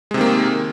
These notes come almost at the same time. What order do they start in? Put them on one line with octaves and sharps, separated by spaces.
G#3 C3 D#3 A#3